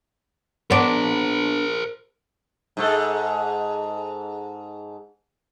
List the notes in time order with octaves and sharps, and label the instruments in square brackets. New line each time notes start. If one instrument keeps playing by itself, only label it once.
[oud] B3 D4 [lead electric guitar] A#4 C5
[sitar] G#2 G#3 A4